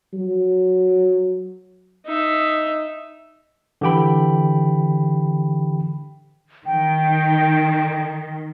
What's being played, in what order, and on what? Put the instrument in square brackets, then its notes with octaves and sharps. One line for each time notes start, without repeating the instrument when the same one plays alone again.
[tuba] F#3
[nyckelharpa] D#4 E5
[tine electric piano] D3 E3 G4 G5 B5
[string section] D#3 [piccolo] G5